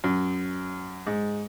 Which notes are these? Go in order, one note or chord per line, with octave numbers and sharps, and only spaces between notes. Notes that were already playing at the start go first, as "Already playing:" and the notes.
F#2
G#2